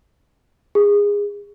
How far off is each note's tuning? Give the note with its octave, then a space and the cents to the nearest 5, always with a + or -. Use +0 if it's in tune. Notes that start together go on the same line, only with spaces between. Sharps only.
G#4 -25